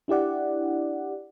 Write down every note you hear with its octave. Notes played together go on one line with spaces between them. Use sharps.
D4 E4 G4 D5 F#5